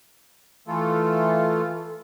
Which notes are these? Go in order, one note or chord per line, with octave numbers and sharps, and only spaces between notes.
E3 A3 F4 A4